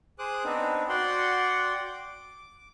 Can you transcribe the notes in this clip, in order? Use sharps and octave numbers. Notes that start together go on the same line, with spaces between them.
G#4 C5 D6 D#6 F#6
B3 C4 D4 D#4
F#4 D5 F#5 G5 C6
D6